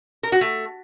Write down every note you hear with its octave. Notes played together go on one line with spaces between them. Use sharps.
A#4
F#4
A3